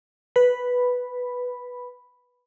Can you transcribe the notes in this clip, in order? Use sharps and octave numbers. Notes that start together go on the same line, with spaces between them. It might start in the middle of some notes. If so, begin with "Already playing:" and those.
B4 B5